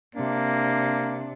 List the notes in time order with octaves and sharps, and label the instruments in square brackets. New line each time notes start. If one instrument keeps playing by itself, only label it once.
[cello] C3 D4 [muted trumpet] A#3